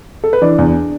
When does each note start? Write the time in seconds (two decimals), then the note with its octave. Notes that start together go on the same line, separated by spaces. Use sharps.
0.24 A4
0.33 B4
0.42 E3 D4 D5
0.58 E2